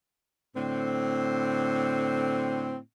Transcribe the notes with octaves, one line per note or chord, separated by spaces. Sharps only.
A2 D3 C4